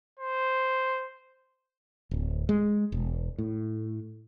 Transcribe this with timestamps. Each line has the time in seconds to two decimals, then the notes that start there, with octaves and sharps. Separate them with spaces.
0.20 C5
2.11 D1
2.49 G#3
2.92 E1
3.38 A2